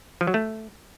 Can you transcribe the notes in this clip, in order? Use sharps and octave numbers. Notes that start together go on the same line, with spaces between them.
F3
F#3
A3